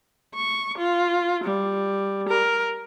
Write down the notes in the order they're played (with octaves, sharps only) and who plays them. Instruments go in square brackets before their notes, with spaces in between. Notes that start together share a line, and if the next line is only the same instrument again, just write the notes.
[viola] C#6
F4
G3
A#4